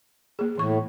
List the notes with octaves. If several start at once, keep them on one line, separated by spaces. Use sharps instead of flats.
A#3 G#4
A2 E3 C#6